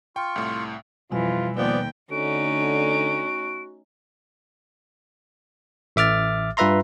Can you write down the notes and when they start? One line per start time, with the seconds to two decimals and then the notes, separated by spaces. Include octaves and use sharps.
0.16 F4 G5 C#6
0.36 C2 A2
1.12 F2 B2 E3 G3 F4 G#5
1.57 D#2 F3 B3 D5 G5
2.11 D3 A3 C#4 D#4 F#4 D7
5.96 A1 E5 D6 F6 A6
6.57 G2 F4 B4 E5 A#5 C6